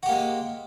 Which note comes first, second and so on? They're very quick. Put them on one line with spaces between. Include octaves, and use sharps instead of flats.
F#4 G4 A#3 G#3